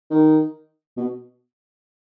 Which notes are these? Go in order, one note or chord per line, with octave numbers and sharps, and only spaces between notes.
D#3
B2